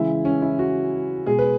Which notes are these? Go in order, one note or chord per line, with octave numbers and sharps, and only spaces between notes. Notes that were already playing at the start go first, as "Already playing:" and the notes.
Already playing: C#3 E3 G#3 E4
C#4
E4
F#4
B2 G#3 G#4
B4